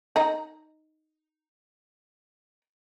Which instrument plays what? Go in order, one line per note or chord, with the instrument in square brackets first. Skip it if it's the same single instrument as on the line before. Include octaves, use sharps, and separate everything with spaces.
[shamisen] D#4 A#5